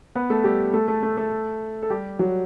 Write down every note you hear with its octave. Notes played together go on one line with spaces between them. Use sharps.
B3 B4
A3 A4
G3 G4
A3 A4
A3 A4
A3 A4
A3 A4
A4
G3 G4
F#3 F#4